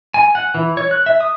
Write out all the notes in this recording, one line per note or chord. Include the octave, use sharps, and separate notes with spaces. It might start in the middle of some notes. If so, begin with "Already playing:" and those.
G#5
F#5
E3
C#5
F#6
E5
D#6